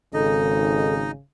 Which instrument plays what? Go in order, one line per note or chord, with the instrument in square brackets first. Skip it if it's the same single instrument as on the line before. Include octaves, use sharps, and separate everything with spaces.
[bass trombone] G#1 [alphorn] C#3 [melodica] D#4 D#5 [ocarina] A4